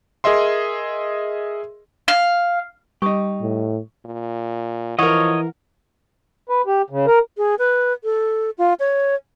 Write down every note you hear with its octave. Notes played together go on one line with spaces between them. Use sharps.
G#4 A#4 D#5 E5 C6
F5
G3 D#4 G4 C#6 D#6
A2
A#2
E3 F3 A#4 C#5 D#5 F#5
B4
G4
C#3
A#4
G#4
B4
A4
F4
C#5